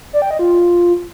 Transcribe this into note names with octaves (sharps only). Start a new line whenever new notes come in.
D5
G5
D#5
F4